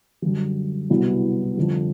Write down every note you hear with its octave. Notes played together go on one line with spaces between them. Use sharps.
F#2 D3 G3
C2 B2 F#3 B3 E4
F2 D3 G3